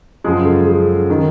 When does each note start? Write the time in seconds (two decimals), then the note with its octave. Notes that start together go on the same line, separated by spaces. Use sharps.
0.24 F#2 C#3 F3 G#3 G#4
0.45 A4
0.67 G#4
1.10 D#3 G#3